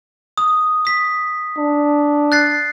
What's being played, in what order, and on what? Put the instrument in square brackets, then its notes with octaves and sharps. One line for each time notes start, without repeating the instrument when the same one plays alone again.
[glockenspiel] D#6
D#6 B6
[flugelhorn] D4
[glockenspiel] F#6 A6 C7